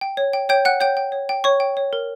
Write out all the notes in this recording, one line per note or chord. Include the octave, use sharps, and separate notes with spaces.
G5
C#5
G5
C#5 G5 G6
F#5 G5 F#6
C#5 G5 G6
G5
C#5
G5
C#5 C#6
G5
C#5
A#4